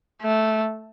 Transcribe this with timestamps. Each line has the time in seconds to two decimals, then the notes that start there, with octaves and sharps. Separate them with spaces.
0.22 A3